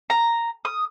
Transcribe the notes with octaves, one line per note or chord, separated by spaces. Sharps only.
A#5
D#6